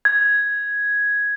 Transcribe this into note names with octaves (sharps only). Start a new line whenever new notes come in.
G#6